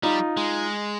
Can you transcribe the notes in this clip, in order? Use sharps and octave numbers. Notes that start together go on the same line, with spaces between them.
G3 D#4 F4
G#3